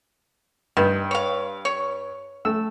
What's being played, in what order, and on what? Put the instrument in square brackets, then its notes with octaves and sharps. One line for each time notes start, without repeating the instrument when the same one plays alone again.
[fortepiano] G2 [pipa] D#3
[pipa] C#5 F5
C#5
[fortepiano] A3 E6